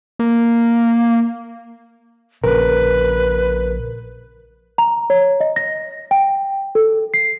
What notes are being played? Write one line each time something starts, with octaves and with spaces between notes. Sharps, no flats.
A#3
A#1 C#3 A#4 B4
A#5
C#5
D#5
A#6
G5
A4
C7